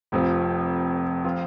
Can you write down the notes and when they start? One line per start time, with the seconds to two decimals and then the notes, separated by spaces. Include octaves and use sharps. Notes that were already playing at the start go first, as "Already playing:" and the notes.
0.12 F1 F2 F3
1.24 F3 C4 F4